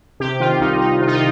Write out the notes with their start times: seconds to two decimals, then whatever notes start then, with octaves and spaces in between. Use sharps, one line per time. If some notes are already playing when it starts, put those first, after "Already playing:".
0.20 C3 G4
0.40 D#3 F4
0.60 C2 D#4
0.81 C2 D#4
1.01 C3 F4
1.08 D#4
1.15 F4